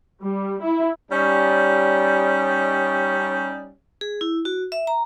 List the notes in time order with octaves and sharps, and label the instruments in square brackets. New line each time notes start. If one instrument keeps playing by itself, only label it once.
[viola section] G3
E4
[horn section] G3 C#4 D#4
[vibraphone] G#4
E4
F#4
E5
A#5